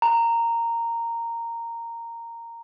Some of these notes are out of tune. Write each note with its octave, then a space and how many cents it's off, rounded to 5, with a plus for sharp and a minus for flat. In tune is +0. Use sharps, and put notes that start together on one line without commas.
A#5 -10